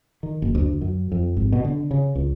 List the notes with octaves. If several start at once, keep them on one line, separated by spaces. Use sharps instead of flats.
D#3
F#1
D2
F#2
F2
G#1
B2
D3
C#3
C#2